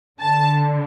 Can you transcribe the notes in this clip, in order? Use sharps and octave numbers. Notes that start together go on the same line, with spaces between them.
D3 A5